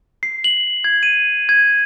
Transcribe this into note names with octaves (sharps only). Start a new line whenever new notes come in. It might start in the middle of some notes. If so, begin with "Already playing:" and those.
C7
F#7
G#6
D#7
G#6